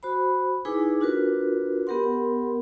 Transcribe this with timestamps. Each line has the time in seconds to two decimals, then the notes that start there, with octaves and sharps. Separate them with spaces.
0.03 F#4 C5 B5
0.65 D#4 E4 G#4 B4 G#5 D6
1.01 D4 F4 F#4 A#4 B4
1.87 B3 G4 A#4 F#5 C6